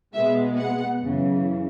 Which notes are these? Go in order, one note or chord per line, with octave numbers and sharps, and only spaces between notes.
B2 G#3 B3 E5
F#5
F#2 C#3 E3